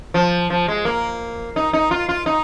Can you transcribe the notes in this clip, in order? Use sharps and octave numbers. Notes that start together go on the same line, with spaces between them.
F3
F3
G#3
A#3
D#4
D#4
F4
F4
D#4